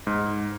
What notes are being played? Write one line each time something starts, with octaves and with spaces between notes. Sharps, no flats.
G#2